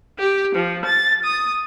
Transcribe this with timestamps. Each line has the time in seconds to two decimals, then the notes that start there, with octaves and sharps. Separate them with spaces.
0.18 G4
0.55 F3
0.85 A6
1.23 D#6